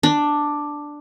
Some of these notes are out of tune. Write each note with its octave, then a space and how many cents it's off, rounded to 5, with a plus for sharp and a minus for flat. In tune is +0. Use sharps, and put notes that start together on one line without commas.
D4 +5